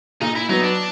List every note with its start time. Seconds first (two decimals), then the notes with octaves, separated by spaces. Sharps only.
0.21 A#2 D#4
0.35 E4
0.49 F#3 B3 D#4
0.63 D4